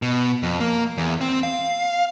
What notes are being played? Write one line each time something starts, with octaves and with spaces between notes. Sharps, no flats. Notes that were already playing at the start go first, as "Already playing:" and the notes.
B2
F2
A#3
E2
C4
F5